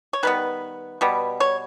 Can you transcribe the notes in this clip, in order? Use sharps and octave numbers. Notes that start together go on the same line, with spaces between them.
C#5
D#3 G3 B3 B4
B2 G3 B3
C#5